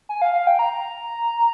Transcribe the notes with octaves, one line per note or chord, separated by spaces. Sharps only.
G#5
F5
F5
G5
A#5